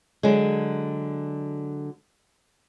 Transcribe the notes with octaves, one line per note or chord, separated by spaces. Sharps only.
D3 F#3 G#3